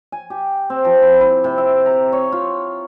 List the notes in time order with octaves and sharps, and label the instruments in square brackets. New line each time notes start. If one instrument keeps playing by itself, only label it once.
[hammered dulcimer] G#5
G4
C4
F3
E4
E4
C3
E5
A#5
C#5
F4